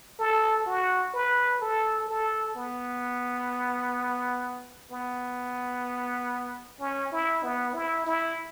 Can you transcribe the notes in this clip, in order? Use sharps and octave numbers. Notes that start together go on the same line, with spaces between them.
A4
F#4
B4
A4
A4
B3
B3
C#4
E4
B3
E4
E4